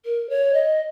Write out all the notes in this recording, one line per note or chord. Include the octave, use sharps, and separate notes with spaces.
A#4
C#5
D#5